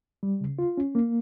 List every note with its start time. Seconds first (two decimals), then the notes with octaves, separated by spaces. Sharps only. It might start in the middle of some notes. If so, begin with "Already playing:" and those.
0.23 G3
0.41 C#3
0.59 F4
0.77 C#4
0.95 A#3